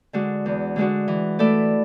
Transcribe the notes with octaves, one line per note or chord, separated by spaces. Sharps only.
D3 G#3 D4 F#4
E2
D3 G#3 D4 F#4
E3
A3 E4 A4 D5